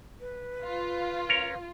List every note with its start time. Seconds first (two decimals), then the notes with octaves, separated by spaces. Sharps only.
0.20 B4
0.64 F4
1.29 C#4 A#4 C#5